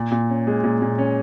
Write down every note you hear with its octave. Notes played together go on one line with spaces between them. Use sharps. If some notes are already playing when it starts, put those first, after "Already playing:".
Already playing: A#2
A#2
C#4
G#3
A#2
A#2
C#4